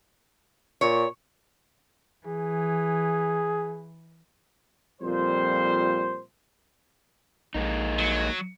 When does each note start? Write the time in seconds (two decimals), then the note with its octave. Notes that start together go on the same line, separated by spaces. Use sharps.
0.81 A#2 C#5
2.27 E3 G#4
5.00 F2 A#2 G3 C5
7.55 A#1 G#3 A#3 D#4
7.99 F#3